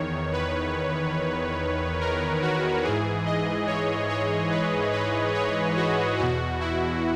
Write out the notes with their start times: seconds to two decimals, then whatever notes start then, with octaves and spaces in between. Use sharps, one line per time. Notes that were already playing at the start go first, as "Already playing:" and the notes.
Already playing: E2 D#3 C#5
0.33 B4
2.00 A#4
2.42 F#4
2.83 G#2 E3 G#4
3.25 D#5
3.67 C#5
4.09 C#5
4.51 B4
4.93 B4
5.34 C#5
5.76 F#4
6.18 E2 B2 F#4
6.60 E4